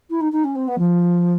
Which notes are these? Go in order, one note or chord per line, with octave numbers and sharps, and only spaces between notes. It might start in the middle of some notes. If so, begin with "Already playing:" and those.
E4
D#4
D#4
C#4
C4
B3
F3